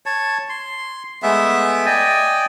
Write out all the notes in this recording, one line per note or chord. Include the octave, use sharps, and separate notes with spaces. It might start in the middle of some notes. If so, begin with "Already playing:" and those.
C#5 A5
C6
G#3 A3 B3 E5
D5 D#5 G5 G#5